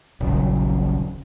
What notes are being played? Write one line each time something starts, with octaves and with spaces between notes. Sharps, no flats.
D#1 A#1 C#3 F#3